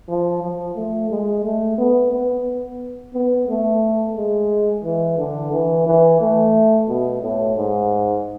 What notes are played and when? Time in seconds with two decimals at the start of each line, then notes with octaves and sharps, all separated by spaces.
0.08 F3
0.42 F3
0.75 A3
1.10 G#3
1.44 A3
1.78 B3
2.12 B3
3.14 B3
3.48 A3
4.17 G#3
4.85 E3
5.18 D3
5.53 E3
5.86 E3
6.21 A3
6.88 B2
7.22 A2
7.57 G#2